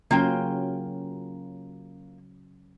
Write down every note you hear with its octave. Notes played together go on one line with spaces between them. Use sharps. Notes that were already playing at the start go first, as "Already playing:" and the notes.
C#3 F#3 A#3 C#4 F4 G5